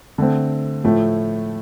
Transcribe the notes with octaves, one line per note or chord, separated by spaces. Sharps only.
D3 A3 C4
A2 F3 A3